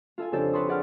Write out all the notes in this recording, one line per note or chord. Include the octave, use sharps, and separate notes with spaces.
F4 A4 F5 G#5
F2 C#3 D4 G4 A4 C5
B4 C#5 A5 C6 D#6
G#4 D5 F#5 C6 F6